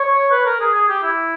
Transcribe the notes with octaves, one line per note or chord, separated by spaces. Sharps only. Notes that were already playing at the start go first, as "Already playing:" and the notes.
Already playing: C#5
B4
A#4
G#4
G#4
G4
E4